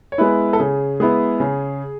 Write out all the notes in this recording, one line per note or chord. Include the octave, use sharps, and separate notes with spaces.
C#5
G#3 B3 E4 B4
A4
C#3 G#4
G#3 B3 E4 G#4
C#3